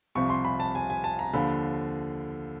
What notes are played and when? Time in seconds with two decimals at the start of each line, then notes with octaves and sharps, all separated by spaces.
0.15 C2 C3 F3 C#6
0.30 C6
0.45 B5
0.60 A5
0.75 G#5
0.90 G#5
1.04 A5
1.19 A#5
1.33 D#2 D3 F3 B5